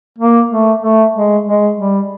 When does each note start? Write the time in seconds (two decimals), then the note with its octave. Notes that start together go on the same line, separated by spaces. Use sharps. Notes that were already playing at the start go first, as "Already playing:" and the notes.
0.19 A#3
0.50 A3
0.83 A3
1.15 G#3
1.46 G#3
1.77 G3